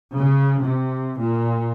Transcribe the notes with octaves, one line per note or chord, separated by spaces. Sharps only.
C#3
C3
A#2